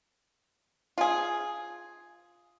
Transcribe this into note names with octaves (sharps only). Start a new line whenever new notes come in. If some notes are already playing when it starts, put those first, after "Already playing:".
F4 G#4